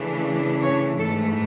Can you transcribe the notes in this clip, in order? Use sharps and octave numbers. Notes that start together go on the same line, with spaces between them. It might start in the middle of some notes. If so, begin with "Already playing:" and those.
Already playing: C#3 E3 A3 D4
C#5
G#2 E3 A3 A4